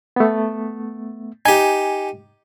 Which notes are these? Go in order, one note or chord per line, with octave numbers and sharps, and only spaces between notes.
A3 B3
D#4 G4 G#5